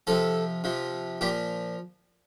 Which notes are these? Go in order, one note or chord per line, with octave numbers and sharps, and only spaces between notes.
C3 F3 A4
C3 F3
A#2 F3 G4